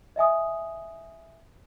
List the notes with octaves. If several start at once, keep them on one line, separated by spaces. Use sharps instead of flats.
D#5 E5 G#5 D#6